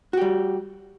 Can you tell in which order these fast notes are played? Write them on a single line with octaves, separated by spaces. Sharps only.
F#4 G4 G3